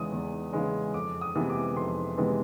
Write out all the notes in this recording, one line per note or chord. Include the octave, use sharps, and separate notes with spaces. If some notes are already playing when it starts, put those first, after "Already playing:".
Already playing: E2 C#3 E3 G#3 D#6
E2
C#3 E3 G#3
F2 D6
D#6
C3 E3 G#3 B3
D6
F2 C6
C3 E3 G#3 B3